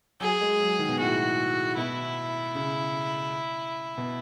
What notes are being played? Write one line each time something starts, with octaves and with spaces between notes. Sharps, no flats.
F#3 G#4
G#3
F#3
D#3
B2
A2 F#4
B2 E4
C#3
B2